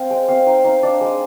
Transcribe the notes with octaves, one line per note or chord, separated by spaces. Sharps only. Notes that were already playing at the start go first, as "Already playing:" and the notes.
Already playing: C4 F5
G#3 G5
C4 F5
D#4 G5
D#4 F5
D4 D5
G#3